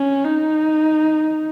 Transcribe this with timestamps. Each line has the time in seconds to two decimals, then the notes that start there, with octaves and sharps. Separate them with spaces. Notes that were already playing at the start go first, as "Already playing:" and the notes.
Already playing: C#4
0.25 D#4